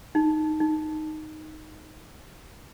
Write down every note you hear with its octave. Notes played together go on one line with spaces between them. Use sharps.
D#4
D#4